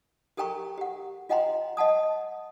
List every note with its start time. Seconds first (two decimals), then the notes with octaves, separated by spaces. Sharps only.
0.37 G4 A4 A#4 G5 A#5 C#6
0.78 G4 F#5
1.29 F4 D#5 F#5 G5 A#5 C6
1.77 D#5 F#5 A5 D#6